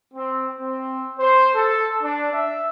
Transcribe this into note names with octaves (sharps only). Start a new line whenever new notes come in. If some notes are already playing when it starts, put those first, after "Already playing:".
C4
C4
C5
A4
D4
E5